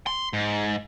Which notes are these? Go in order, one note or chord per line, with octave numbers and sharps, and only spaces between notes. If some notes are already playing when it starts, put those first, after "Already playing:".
C6
G#2